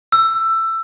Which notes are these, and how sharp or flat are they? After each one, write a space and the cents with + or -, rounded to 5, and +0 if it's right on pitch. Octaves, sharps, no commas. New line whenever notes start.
E6 +15